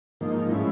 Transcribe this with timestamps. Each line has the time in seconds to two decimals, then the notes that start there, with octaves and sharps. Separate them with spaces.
0.21 G#2 F3 A#3 D#4
0.51 A2 F3 G#3 C#4 E4